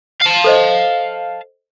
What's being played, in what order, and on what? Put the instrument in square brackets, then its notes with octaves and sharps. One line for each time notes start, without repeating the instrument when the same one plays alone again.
[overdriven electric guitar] F5 A5
[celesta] A4 C5 D#5